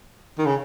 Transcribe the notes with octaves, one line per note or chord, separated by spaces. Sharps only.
D#3
C#3